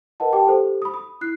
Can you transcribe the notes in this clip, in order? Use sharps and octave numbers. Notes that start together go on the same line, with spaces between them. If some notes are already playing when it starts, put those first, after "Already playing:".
A#4 B4 D#5 F#5 A5
G4 G5 A5 D6
G4 A4 C5
B5 D#6
D#6
E4 F#6 C7